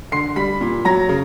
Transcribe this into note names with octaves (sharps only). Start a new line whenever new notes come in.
D3 C6 C7
G3 B5 B6
A#2
F#3 A#5 A#6
C#3